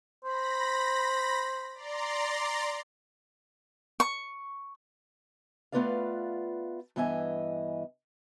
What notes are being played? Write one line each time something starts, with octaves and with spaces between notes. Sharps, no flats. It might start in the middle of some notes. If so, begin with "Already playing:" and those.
C5 B5 A#6
D5 A#5 C6
C#6
A3 B3 F4 B4 D5 F5
G2 E3 B3 D#5 E5 G#5